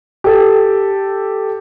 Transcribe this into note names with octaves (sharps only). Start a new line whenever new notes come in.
G4 A4